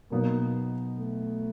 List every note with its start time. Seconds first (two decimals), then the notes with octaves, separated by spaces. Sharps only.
0.11 B2 F#3 A#3 B3 D#4
0.98 A3